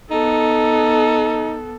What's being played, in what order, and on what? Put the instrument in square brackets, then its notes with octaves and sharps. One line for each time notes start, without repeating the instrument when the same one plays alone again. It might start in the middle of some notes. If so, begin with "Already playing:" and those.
[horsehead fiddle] B3 A4 [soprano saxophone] D#4